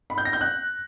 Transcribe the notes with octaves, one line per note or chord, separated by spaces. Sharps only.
B5
G6
A#6
G6
F#6